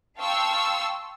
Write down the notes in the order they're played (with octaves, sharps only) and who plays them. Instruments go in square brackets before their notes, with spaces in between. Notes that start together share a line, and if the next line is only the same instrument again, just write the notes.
[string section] F5 G5 A5 C6 C#6 E6